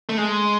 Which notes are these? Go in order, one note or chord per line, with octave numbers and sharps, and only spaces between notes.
A3
G#3